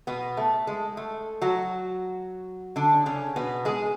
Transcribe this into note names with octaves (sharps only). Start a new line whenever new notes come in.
B2 B3
A3
G#3
A3
F#3 F#4
D3 D4
C#3 C#4
B2 B3
G#3 G#4